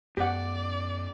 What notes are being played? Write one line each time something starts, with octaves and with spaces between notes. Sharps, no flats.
F#2 B3 G4 D5 F#5